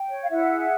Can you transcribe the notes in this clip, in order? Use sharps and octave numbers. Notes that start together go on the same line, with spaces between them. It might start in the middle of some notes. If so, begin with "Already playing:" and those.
Already playing: G5
C#5
F5
E4 E5 F#5
G#4